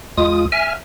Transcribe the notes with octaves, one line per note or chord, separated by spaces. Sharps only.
E2 G#3 F4 D#6
E5 G#5 F6